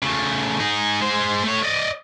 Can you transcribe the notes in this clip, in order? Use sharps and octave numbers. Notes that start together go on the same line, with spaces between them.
C#3 A3
D#4 G#4
G#3 C5
A3 C#5
D5 D#5